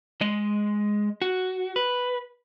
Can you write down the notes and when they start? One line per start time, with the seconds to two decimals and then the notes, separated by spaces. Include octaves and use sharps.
0.21 G#3 D#5
1.22 F#4
1.76 B4